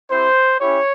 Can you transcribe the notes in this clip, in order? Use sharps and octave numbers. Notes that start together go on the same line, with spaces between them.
C4 E4 G4 C5
C#4 E4 G4 C#5